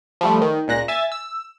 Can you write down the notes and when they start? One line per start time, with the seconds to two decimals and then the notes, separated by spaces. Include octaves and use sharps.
0.21 F3 G3 A3
0.41 D#3
0.68 C#2 A#2 F#6 A#6
0.88 E5 G#5 A6
1.12 E6